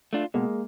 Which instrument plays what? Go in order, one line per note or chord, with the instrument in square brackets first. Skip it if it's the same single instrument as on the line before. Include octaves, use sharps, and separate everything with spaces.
[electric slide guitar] A3 D4 F4
[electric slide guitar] B2 [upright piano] G#3 A#3